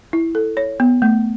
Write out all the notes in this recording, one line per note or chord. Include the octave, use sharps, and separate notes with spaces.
E4
A4
C#5
B3
A3